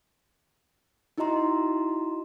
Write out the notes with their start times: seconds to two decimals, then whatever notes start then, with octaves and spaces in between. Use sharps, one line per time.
1.18 D#4 E4 F#4 D#5 A#5 C6